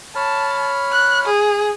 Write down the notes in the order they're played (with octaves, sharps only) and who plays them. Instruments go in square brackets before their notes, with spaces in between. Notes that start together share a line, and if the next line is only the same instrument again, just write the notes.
[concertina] C#5 B5 F6 [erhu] A5
[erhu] F#6
G#4